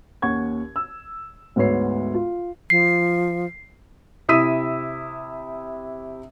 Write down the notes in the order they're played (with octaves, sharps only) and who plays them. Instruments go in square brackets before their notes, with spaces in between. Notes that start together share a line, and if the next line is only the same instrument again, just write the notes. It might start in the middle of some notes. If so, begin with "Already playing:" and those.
[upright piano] D#2 C#4 F#5 C#6 G#6
E6
D2 G#2 B3 C#5 C7
F4
[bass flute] F3 [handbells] C7
[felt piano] C3 E4 D#6 E6 B6 D#7